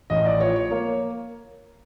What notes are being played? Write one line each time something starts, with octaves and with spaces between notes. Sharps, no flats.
A1 D#5
D5
F3 C#5
C#5
A#3 C#5